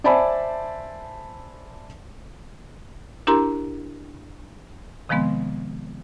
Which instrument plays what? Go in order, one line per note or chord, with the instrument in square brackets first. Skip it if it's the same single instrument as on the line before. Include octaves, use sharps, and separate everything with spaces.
[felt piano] C5 D5 E5 G#5 A5 B5
[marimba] D4 E4 G4 A#4 A#5 C6
C3 D#3 F3 G#3 B3 C4